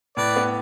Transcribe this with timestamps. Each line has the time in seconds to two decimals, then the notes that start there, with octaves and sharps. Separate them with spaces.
0.17 A2 B4 D5
0.36 B3